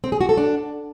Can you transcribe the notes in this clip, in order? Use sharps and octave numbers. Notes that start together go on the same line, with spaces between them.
C4
G#4
F#4
A4
D4